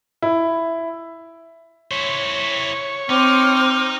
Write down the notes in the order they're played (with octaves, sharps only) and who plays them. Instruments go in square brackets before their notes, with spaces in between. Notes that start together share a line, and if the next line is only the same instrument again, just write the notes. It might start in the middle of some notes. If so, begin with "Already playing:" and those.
[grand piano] E4
[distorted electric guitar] E4 C5 [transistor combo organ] C#5
[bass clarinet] C4 [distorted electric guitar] D#4 [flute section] C5 D6 F6